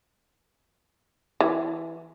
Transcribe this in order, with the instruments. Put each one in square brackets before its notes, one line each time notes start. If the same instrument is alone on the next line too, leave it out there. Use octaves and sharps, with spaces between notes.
[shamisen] E3